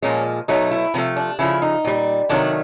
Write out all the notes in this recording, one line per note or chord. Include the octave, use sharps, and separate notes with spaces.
A#2 F3 G#3 C#4
B2 F#3 A3 D#4
E4
C3 F3 A3
D4
C#3 F3 A3 E4
D#4
A#2 G3
C3 D#3 F#3 A3 D4